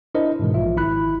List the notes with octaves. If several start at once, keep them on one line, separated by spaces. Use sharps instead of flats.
D4 E4 A#4 C5 D#5
G#2 B2 E3 G#3
A#1 F4 E5
G#1 E4 B5 F#6